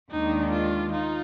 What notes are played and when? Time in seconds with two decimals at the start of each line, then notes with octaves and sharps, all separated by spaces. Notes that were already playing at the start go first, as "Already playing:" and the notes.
0.12 D#2 D#3 G#3 D4 D#4
0.53 F4
0.93 D#4 F4